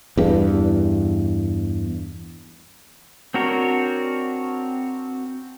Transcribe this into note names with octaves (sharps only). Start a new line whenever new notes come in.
E2 G2
C4 D4 F#4 A#4 C#5